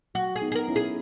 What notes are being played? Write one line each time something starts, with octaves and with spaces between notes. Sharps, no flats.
F#3 F#4
G#4
B3 D#4
G#4
A#4
C#4 E4
G#4